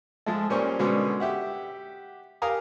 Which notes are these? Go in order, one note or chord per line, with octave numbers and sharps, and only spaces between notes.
F3 G#3 A3
A#2 G3 C#4 A#4 C5 C#6
B2 D3 G#3 B3 C#4
G4 E5 F#5
G4 A#4 F5 G#5 A#5 D#6